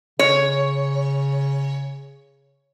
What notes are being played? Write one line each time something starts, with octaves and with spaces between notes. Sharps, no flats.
C#3 C#5